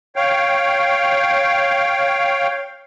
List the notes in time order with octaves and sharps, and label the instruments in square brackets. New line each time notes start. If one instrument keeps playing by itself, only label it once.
[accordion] C#5 F5 G5